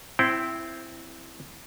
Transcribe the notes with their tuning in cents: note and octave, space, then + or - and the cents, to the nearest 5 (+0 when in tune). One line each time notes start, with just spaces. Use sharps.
C4 +0 E4 +10 G5 -25